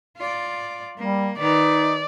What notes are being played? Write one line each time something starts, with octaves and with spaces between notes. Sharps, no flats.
F4 D5
G3 A#3
D#3 D#4 B4 D5